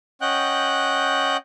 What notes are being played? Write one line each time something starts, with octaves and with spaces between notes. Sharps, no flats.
C#4 D#5 F#5 G5 F#6 G6